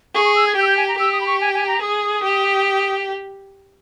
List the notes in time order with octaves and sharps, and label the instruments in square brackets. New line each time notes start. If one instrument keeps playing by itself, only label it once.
[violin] G#4 [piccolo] C#6
[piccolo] C#6
E6
G#6
[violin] G4 [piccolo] G6
[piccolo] E6
G6
G#5
A#5
[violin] G4 [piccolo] E6
[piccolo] D#6
B5
C#6
G#5
G#5
A#5
[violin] G#4 [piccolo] D#6
[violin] G4